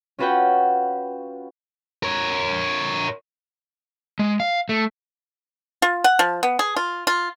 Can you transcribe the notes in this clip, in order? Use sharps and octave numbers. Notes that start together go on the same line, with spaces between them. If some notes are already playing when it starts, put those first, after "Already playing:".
C#4 F4 F#4 B4 F#5 G5
A#4 C#5
G#3
F5
A3
F4
F#5
F3
B3
G#4
F4
F4